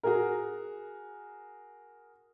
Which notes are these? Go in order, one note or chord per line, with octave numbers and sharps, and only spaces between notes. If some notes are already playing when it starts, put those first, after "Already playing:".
F#4 G#4 A#4